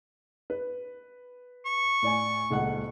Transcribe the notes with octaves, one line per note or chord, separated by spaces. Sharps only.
B4
C#6
A2 D5 G#5
D#1 C#2 F#5